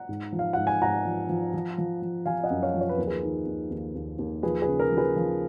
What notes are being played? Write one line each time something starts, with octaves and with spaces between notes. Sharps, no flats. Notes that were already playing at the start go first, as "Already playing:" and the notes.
Already playing: F#5 A#5
G#2
F3
F5
G#2 F#5
G#5
G#2 F#5 A#5
F3
F3
F3
F3
F3
F3 F5 G#5
D#5 F#5
F#2
C#5 F5
F3
C#5
B4
D#2 A#4
G#4 B4
D#3
D#2
D#2
D#2
D#2
F3 G#4 B4
G#4 B4
C#3
A#4
F3
G#4 B4
F3